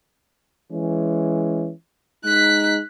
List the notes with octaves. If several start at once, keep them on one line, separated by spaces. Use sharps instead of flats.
E3 G#3 C#4
G#3 D#4 F#6 B6